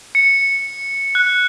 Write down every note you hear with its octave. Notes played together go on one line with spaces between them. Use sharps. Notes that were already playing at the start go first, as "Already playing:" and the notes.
C#7
F#6